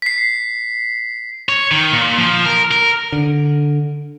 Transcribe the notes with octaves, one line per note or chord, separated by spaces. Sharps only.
B6 C7
C#5
D#3
A#2
F3
A#4
A#4
D3